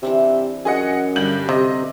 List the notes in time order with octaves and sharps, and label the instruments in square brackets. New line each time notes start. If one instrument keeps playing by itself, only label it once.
[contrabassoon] C3 [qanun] E3 D4 E5
[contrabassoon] F#2 [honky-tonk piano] G#4 D#5 F#5
[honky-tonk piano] G2 G6 F#7 [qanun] D3 G3
[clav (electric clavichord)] C3 [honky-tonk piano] D#5